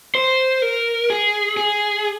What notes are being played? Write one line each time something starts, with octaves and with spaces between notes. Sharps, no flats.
C5
A#4
G#4
G#4